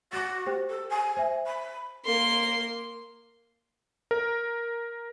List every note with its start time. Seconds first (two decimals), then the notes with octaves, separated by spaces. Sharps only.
0.13 F#4 D6 A6
0.46 G4 C5 G5
0.70 A4
0.90 G#5
1.17 C5 E5
1.47 B5
2.06 A#3 C6
4.11 A#4